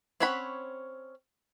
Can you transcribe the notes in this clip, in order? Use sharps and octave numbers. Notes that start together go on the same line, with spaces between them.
C4 C#4 C#5 F#5 B5